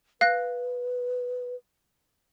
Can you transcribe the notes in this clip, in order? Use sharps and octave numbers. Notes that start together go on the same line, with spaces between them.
B4 F5 F#6 A#6